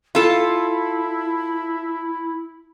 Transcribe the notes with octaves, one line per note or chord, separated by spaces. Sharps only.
E4 F4 A4